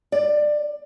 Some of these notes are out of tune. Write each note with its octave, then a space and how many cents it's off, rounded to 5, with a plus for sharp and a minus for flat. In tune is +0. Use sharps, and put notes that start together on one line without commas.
D5 +20